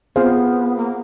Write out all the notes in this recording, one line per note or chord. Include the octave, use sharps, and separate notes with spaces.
B3 C4 F4 G#4 C5 F5
A#3